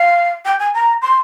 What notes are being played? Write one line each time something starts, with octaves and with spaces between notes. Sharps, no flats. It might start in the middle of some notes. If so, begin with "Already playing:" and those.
Already playing: F5
G5
G#5
A#5
C6